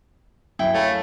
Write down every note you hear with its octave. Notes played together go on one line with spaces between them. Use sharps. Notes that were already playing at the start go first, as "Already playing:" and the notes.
F#2 E4 G5
A3 C#5 F5 G#5 B5